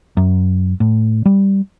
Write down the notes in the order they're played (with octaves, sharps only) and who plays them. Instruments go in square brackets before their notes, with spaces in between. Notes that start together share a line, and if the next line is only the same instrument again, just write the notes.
[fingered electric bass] F#2
A2
G3